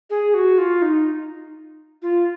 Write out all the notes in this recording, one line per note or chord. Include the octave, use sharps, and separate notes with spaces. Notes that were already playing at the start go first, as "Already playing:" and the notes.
G#4
F#4
F4
D#4
F4